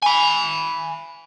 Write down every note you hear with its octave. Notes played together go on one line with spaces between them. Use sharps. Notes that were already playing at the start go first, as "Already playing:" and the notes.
G#5 B5